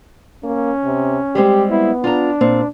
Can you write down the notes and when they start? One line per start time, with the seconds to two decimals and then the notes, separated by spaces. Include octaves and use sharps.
0.44 A#3 C#4
0.85 C3
1.35 G3 G#3 C4 G4
1.71 B3 E4
2.04 D4 F4 A#5
2.41 A#2 C4